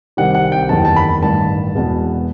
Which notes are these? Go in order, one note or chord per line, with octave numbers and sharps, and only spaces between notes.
C2 C3 D#3 G3 F#5
F#5
G5
F#1 E2 D#3 A5
A5
B5
A1 G2 D#3 A5
E1 E2 B2